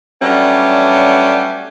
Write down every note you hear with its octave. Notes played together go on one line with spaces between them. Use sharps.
F#3 G3 A3 B3 C#4 D4